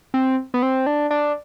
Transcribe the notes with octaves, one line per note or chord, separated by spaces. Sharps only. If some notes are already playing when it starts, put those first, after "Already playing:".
C4
B3
C4
D4
D4